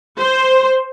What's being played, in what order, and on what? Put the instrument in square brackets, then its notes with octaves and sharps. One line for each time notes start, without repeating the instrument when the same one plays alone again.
[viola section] C5